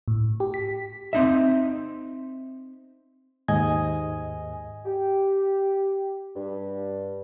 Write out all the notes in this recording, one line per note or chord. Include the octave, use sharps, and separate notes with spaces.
A2
G4
B6
C4 D#4 E5
D#2 G#2 D#5 G#5 D#6
G4
G2